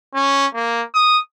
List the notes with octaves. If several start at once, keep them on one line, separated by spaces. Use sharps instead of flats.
C#4
A#3
D#6